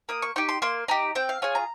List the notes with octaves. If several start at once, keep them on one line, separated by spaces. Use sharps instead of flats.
A#3 D#6
C#6
D#4 G4 C#6
C6
A#3 C6
D#4 G4 A#5
C4 G5
F5
F4 G#4 C#5
A#5